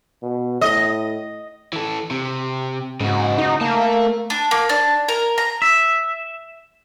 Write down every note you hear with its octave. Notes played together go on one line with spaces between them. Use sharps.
B2
A2 D#5
E3 A4
C3
G#2 C#3 F#4
D#4
A3 A#3 A5
D4
A#3
D4
A#4
A#5
E5